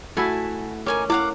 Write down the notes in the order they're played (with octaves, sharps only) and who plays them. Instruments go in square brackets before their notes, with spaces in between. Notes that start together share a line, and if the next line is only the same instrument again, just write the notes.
[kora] A3 E4 E5 [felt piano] F#4 [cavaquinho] G#5 A5
[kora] C#4 [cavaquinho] D#4 G#5 D6 [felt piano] A#4
[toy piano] E4 [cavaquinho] F5 F#5 D6